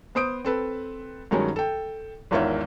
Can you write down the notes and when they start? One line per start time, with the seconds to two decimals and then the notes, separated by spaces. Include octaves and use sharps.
0.15 B3 C5 D#6 D7
0.45 C4 A4 B4
1.31 G2 D#3 F#3 G#3 C#4
1.56 A4 G5
2.31 G#1 E2 D#3 F4 C#5 E5